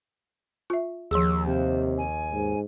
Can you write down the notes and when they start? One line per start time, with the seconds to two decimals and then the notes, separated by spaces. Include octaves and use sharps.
0.70 F4 E5
1.11 D#2 F3 G#4 E6
1.46 C3 C5
1.98 G#5
2.32 G#2